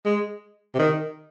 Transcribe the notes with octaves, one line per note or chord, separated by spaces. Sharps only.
G#3
C3
D#3